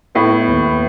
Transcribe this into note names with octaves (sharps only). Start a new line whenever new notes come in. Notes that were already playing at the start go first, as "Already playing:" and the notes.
A2 B3
B3
D#2
B3